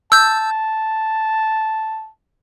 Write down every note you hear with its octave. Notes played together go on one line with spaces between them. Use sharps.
A5 E6 G6